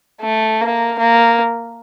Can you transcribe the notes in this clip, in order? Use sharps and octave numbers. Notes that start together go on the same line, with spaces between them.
A3
A#3
A#3